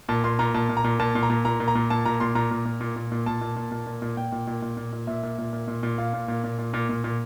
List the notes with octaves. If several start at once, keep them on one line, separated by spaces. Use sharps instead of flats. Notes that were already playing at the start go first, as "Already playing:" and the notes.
A#2 A5
A#2 C6
A#2 A#5
A#2 A5
A#2
A#5
A#2
A#2 A5
A#2
A#5
A#2
A#2 A#5
A#2
A#5
A#2
A#2 A5
A#2 A#5
A#2 C6
A#2 A#5
A#2
A#2
A#2
A#2
A#2
A#2 A5
A#2
A#2
A#2
A#2
A#2
A#2 G5
A#2
A#2
A#2
A#2
A#2
A#2 E5
A#2
A#2
A#2
A#2
A#2
A#2 F5
A#2
A#2
A#2
A#2
A#2
A#2
A#2